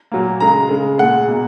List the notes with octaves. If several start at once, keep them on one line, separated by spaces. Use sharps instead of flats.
A#2 F#3 A#3
C#3 G#3 A#5
C#3 G#3
A#2 G#3 F#5
B2 A#3